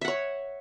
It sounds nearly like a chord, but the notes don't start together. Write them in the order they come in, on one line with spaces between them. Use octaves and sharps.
E5 F#5 C#5